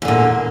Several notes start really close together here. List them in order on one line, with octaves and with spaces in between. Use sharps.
E2 D3 A#2